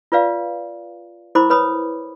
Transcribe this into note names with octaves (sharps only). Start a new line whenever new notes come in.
F4 B4 D5 F5
E4 A#4 C5 B5 D6
B4 C#5 B5 D#6